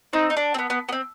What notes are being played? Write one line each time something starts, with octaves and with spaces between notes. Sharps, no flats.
C4 D#4
D#4
D4
C4
B3
B3
B3
C4